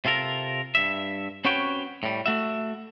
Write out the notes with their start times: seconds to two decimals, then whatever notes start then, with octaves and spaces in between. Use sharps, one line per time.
0.05 C3 F4 A4 A#4
0.75 G2 E5
1.45 C4 C#4 F#4 B4 C#5 G5
2.03 A2 G3
2.26 A3 F#4 E5